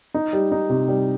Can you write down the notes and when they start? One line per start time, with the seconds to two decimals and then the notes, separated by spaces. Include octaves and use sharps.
0.14 D#4
0.33 G3
0.52 D#4
0.70 C3
0.88 G3